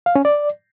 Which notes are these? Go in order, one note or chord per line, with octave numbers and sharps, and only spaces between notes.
F5
C#4
D5